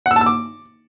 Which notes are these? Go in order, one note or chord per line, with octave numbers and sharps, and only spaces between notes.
F#5
E6
A5
E6
D6